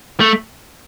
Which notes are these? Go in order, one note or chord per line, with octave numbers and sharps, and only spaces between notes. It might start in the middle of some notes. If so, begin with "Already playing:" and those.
A3